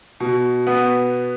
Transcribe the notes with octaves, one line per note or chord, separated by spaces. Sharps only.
B2
B3